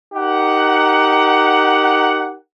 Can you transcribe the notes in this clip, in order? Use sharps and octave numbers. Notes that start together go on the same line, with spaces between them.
D#4 G4 A#4 F#5